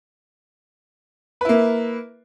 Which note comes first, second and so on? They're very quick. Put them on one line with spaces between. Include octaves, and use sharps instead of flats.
B4 E4 A#3